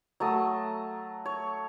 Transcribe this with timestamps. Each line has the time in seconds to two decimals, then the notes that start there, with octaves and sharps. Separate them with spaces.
0.20 F#3 A3 A5 D#6
1.25 C#5